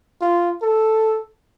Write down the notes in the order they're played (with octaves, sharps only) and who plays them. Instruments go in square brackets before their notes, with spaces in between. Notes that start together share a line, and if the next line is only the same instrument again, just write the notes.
[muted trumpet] F4
A4